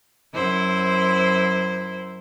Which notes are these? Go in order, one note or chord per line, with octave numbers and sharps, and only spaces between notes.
F#2 E4 C5